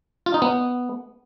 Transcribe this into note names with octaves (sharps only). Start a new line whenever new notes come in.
F4
D#4
B3